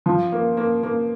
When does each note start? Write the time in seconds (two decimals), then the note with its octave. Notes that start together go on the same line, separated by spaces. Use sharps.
0.06 F3
0.32 A#3
0.57 A#3
0.83 A#3